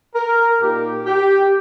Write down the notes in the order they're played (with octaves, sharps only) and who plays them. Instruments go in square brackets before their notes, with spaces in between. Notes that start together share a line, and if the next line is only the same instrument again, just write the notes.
[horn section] A#4
A#2 A#3 D#4 G4
G4